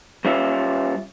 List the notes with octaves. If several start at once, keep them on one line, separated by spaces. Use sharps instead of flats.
G3 C#4 F4 E5